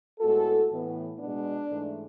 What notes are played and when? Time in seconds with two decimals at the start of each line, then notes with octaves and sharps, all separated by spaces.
0.20 A2 G#3 B3 F#4 A4
0.70 A2 E3 B3
1.19 B2 G#3 B3 D4
1.68 G#2 E3 A3